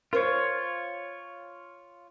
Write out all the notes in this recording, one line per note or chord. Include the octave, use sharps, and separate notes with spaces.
F4 A#4 C5 C#5